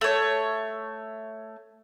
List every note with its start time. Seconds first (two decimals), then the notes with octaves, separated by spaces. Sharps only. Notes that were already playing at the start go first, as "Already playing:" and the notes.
0.01 A3 C#5